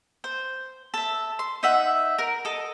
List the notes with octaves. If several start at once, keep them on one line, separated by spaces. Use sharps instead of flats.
C5
A4 E5
C6
D#4 E5 F#5
A#4
A4 D#5